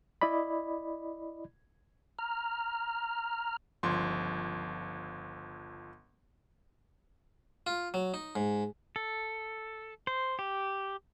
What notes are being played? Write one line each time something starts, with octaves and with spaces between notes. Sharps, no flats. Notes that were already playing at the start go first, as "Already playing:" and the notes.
E4 D5 D#5 B5
A#5 F6
G1 C#2 F3 C6
F4
F#3
D#4
G#2
A4
C5
G4